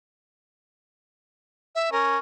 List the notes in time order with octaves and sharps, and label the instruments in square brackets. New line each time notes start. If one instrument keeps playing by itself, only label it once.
[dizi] E5
[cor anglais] C#4 [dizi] A#4